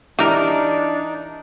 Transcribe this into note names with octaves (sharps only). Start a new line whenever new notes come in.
E3 D4 D#4 G4 A#4